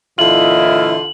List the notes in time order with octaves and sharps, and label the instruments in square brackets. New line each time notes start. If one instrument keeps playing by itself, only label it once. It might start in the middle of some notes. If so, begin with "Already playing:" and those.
[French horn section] A#2 D#5 [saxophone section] D3 F4 [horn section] E3 E4 [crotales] F#7